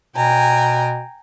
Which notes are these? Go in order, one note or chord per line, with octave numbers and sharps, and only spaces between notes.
B2 G5 G#5 A#5